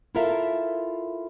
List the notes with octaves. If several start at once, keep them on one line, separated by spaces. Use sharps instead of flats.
E4 F4 A4 A#4 E5 F5